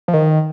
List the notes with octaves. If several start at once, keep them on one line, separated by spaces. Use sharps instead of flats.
F3
D#3